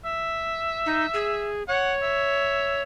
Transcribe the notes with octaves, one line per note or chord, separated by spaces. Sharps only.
E5
D#4
G#4
C#5 F#5
E5